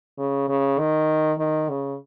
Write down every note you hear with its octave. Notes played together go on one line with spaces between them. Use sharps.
C#3
C#3
D#3
D#3
C#3